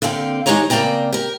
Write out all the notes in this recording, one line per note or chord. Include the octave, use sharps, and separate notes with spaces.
D3 A#3 C4 F5 G5
D#3 G#3 D#4 G4 C#5 A#5
C#3 A#3 C4 D5 G5 A#5
G4 A#4